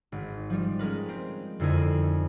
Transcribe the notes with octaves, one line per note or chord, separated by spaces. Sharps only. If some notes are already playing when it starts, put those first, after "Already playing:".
G#1
F3 G3
G#3 C#4 A#4 B4
C4
F2 D3 D#4 E4 A#4 G#5